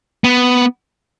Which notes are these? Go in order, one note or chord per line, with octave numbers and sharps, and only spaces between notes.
B3